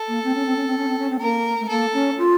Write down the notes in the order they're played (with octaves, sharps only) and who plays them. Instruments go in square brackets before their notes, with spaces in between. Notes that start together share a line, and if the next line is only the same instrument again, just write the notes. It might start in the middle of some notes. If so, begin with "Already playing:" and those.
Already playing: [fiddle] A4
[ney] A#3
C4
C#4
C4
C#4
C4
C#4
C4
C#4
C4
[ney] A#3 [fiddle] A#4
[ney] A3
[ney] A#3 [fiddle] A4
[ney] C#4
F4